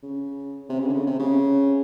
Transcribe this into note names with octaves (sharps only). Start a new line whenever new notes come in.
C#3
C3
C#3
D3
C#3
C3
C#3